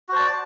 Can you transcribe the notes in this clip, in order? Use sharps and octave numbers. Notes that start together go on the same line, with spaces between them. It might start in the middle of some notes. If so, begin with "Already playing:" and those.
F#4 C5 D5 A5